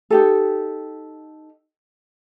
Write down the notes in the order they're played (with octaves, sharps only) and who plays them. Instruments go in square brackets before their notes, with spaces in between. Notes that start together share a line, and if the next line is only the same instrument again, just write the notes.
[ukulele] D#4 G4 A4